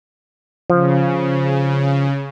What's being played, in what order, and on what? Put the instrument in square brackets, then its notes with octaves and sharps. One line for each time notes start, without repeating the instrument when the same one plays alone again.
[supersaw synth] C#3 [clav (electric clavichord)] F3